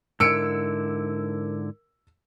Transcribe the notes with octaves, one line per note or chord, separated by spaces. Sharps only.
G#2 D3 E4 A#4 E6 C#7 D7